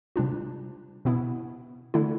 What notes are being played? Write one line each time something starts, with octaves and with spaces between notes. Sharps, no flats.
C3 G3 D4 F4
B2 B3 E4
D3 A3 E4